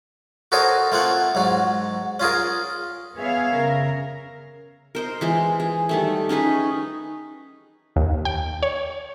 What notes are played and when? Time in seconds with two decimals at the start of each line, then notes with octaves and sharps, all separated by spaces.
0.52 F#4 A4 A#4 C5 C#5 D#5
0.92 A3 A#3 C4 F4 F#5
1.35 G#2 F#3
2.20 C#4 F4 G#4 A#4
3.16 B3 G#4 C#5 E5 F5
3.54 C#3 A#4
4.95 A#4 C5 D#5
5.21 E3 G#3 C5
5.60 G#4
5.89 D#3 G3 A3
6.29 C#4 D#4 G#4 B4
7.96 D#2
8.25 G5
8.63 C#5